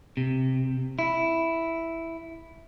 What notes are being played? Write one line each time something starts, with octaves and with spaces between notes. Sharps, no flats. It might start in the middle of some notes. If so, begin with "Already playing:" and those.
C3
E4